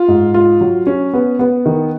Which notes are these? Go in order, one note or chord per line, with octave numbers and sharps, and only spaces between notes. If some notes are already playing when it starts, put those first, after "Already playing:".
Already playing: F4
G#2
F4
F#3
C#4
B3
B3
D#3